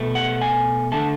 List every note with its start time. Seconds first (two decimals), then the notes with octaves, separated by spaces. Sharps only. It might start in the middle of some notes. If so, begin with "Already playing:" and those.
Already playing: B2 A3
0.15 F#5
0.41 G#5
0.92 D3 A3 A5